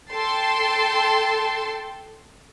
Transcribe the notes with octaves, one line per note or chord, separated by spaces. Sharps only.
A4 G5 A5 C6